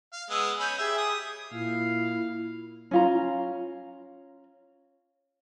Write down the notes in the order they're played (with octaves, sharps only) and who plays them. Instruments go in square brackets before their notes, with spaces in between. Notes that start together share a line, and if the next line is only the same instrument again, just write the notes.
[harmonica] F5
[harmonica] G#3 B3 [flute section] D#6 E6
[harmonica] C#4 B5 [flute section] G6
[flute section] G4 G#4 [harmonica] E5
[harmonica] D#6
[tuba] A#2 [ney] E4 [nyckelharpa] F5
[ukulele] C#4 F4 A#5